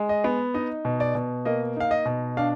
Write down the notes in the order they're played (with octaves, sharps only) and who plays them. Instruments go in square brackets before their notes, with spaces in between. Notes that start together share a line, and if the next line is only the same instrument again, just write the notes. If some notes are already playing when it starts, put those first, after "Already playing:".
Already playing: [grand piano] G#3
D#5
B3
D#4 D#5
B2
D5
B2
A#3 D#5
D#4 F5
D#5
B2
D4 F5